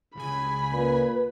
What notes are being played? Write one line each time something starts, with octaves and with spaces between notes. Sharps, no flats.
C#2 C#3 G#5 B5
A#2 B4